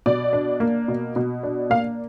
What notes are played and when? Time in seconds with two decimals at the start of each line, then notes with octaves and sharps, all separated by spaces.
0.06 B2 D5
0.33 D4
0.60 A#3
0.88 B2
1.16 B2
1.43 D4
1.70 A#3 F5